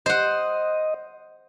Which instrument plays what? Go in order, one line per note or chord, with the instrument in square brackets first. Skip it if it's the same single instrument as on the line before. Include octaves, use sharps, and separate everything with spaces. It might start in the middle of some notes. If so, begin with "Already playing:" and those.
[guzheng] C5 F#5 [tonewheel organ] D#5